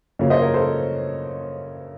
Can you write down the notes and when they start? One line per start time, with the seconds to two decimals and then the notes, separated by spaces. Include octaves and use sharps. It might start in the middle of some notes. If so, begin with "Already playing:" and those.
0.19 F#2 C#3 F3 A#3 C#4
0.30 C5 D#5
0.42 A#4 C#5
0.54 A4 C5